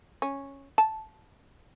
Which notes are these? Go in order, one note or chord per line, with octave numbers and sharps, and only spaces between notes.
C#4
A5